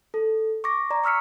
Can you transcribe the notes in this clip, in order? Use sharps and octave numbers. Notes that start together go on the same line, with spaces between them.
A4
C#6 D6 A#6
D5 A#5
C#6 E6 F6 B6 C#7